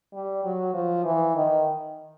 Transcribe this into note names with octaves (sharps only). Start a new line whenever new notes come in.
G3
F#3
F3
E3
D#3